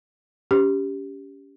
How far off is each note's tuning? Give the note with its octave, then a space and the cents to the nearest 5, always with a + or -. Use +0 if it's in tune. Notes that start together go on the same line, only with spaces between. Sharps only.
C#4 +25 G4 +0